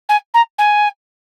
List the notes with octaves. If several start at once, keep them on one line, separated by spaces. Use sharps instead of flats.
G#5
A#5
G#5